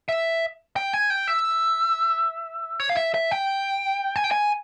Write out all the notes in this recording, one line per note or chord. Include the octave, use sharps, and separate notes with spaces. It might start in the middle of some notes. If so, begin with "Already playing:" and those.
E5
G5
G#5
G5
E5
C#5
F5
E5
E5
G5
G#5
G5
G#5